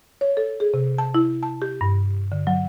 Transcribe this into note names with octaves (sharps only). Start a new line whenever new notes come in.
C#5
A4
G#4
C3
A5
E4
A5
G4
G2
D3
F#3